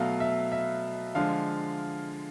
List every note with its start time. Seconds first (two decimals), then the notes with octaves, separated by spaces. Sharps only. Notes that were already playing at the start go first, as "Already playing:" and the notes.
Already playing: B2 F#3 A3 F5
0.20 E5
0.52 E5
1.15 D3 F3 G#3 F5